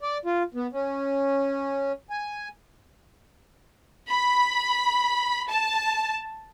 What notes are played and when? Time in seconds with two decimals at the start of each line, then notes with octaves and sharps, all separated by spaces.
0.01 D5
0.25 F4
0.55 B3
0.73 C#4
2.10 G#5
4.09 B5
5.49 A5